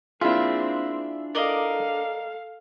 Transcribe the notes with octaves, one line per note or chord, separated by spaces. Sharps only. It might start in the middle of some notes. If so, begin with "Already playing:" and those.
A#3 C4 D4 E4 F4 G#4 E5
A4 A#4 D5 D#5 F5